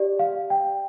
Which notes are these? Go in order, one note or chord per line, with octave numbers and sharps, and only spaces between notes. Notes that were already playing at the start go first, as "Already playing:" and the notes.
Already playing: G4 D5
F5
G5